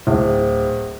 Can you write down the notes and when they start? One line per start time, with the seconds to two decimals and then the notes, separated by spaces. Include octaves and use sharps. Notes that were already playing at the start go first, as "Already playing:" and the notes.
0.07 D1